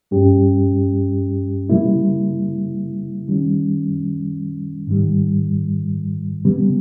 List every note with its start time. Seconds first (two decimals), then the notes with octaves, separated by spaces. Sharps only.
0.11 G2 G3 C#4 G4
1.70 C#3 G3 A#3 E4
3.28 D#3 G3 C#4
4.87 G#2 D#3 G3
6.45 C#3 G3 B3